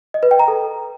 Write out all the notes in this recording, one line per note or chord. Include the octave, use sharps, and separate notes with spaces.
D#5
B4
G5
A#5
A4